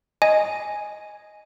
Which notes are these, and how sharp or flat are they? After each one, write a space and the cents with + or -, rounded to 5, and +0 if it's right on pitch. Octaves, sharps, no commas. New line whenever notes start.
D#5 +0 G#5 +0